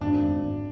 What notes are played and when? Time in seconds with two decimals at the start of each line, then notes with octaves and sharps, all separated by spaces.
0.01 G#1 D4
0.22 G#1
0.43 G#1